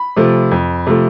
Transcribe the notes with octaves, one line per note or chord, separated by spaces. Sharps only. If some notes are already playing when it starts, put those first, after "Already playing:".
Already playing: B5
C3 F3 A3
F2
C3 F3 A3